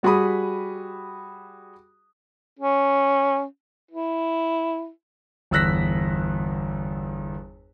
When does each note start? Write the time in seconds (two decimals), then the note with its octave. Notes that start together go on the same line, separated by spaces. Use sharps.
0.03 G3 F#4 G#4 B5 D#6
2.59 C#4
3.91 E4
5.51 G1 E2 E6 F#6 A#6 B6